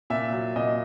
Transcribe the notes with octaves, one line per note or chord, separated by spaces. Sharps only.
A#2 E5
F#3
A#2 D#5